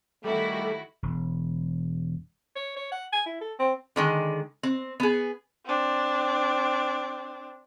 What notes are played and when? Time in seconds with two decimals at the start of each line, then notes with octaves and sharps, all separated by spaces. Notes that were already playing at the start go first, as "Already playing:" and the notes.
0.24 D#3 G3 A3 E4 F#4 A4 B5
1.03 E1
2.55 C#5
2.76 C#5
2.92 F#5
3.12 G#5
3.26 E4
3.41 A4
3.59 C4
3.96 D3 D#3 G#3
4.63 C4
5.00 B3 G#4
5.66 C4 D4